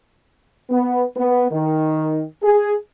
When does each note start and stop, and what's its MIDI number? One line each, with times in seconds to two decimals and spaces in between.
0.70 1.03 59
1.16 1.44 59
1.51 2.22 51
2.43 2.73 68